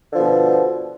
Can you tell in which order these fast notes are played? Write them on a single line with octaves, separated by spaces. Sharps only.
D3 F3 B2